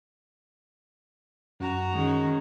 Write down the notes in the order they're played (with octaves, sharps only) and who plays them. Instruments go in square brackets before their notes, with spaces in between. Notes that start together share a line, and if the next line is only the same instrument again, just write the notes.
[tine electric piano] F#2 [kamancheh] F#4 A#5
[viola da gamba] D#3 G#3 C#4